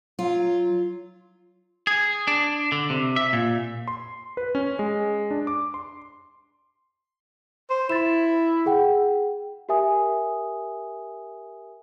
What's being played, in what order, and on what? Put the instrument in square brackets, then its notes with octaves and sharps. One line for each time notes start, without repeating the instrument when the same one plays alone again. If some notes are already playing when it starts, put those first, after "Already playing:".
[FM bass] F#3 [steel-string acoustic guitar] F4
[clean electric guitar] G#4
D4
D3
C3
E5
A#2
[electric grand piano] C6
B4
C#4
G#3
D4
D6
C6
[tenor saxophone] C5
[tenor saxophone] E4 [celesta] A6 E7
[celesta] G#4 F#5 G5
G4 A#4 E5 G#5 D#6